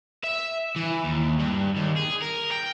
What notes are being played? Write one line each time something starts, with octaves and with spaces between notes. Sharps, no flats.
E5
E3
D#2
G2
D#2
G#4
A#4
G5